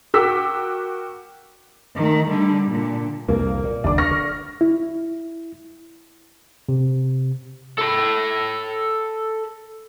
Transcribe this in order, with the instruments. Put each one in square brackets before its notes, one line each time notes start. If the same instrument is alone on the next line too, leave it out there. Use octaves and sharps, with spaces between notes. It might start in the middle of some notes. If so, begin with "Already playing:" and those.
[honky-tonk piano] F#4 A#4 G5 D6 E6 B6
[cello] D#3 A3
D3 G3
A#2 D3
[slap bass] C2 F2 [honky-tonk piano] A#3
[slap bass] A#2
[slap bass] F#1 D#2 [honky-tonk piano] D4 D6
[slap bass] C#3 [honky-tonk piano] C#6 F6 A#6
[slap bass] D3
[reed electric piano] E4
[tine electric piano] C3
[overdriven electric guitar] A4 B5